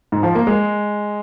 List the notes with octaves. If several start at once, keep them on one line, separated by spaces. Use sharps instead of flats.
G#2
F3
A#3
G#3